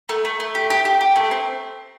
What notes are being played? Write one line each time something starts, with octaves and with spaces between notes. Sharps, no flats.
A3
A3
A3
G4
G4
G4
G4
A3
C4